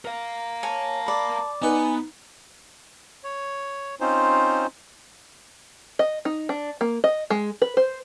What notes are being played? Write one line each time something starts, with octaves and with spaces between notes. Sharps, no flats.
A#4 F5
C#5 G#5 A5
D5 B5
B3 D#4 B4 G#5
C#5
C4 C#4 D#4 F4 C5
D#5
D#4
D4
A#3
D#5
G#3
B4
C5